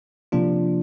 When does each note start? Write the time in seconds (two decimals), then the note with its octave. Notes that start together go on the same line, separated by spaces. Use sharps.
0.32 C3 F3 A#3 D4 F4